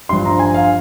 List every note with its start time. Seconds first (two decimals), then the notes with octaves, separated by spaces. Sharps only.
0.09 G2 F3 C6
0.25 A#5
0.39 G#5
0.54 F5